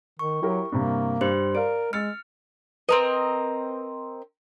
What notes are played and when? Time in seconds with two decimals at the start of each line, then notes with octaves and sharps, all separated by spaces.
0.19 D#3 C#6
0.42 F#3 E4 G4 A#4
0.72 G2 C3 A#3
1.21 G2 G4 C5 C6
1.55 A#4 D5 F5 D7
1.93 G#3 E6 F6 A6 C#7
2.89 C4 A#4 B4 D#5